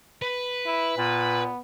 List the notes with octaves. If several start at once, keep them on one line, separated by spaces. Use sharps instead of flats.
B4
E4
A#2 B3